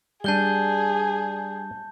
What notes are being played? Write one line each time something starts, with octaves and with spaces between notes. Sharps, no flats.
G3 D4 G#4 A5 G6 G7